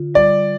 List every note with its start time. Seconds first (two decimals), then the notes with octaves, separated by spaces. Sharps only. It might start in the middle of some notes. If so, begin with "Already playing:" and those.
Already playing: D3 F4
0.14 G3 D5